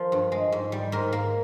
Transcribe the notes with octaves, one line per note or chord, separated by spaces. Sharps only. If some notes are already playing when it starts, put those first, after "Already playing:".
Already playing: F3 A#3
G2
G#3
G#2
G3
G#2 A#4
A#3